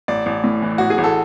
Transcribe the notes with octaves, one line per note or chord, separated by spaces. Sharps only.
A1 D5
A1
A2
E3
A1 F#4
G#4
A1
A4